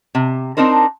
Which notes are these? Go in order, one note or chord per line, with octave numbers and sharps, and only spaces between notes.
C3
C4 D4 D#4 A#4 C5